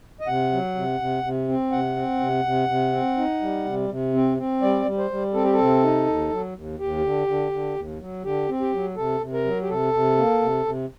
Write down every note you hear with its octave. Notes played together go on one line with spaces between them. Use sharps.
D#5
C3 F#5
F#3
C3
C3
C3
C4
C3 F#5
C4
C3
C3
C3
C4
D#4
G3
C3
C3
C4
C4
G3 D5
G3
C5
G3
C4 A4
G4
A4
C3
D#4
D#2
F#3
D#2
D#2 G4
D3
D3
D3
D#2
F#3
D3 G4
C4
G4
F#3
C3 A4
C3
A#4
F#3
G4
C3 A4
C3
A#3
C3
C3